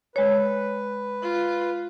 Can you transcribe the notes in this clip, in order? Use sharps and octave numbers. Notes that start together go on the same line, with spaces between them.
G#3 B4 C#5
F4